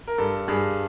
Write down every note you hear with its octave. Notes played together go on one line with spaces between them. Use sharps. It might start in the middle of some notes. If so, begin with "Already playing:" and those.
A#4
G2 A4
G2 G#4